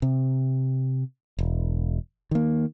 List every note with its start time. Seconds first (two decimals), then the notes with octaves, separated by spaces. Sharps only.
0.02 C3
1.39 E1
2.31 D#3 A#3